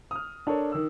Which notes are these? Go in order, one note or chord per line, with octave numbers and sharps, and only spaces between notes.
D#6 F6
D4 A4 A#4 C#5
D#3 E6